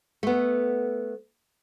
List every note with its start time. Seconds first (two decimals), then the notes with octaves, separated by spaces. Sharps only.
0.23 A3 B3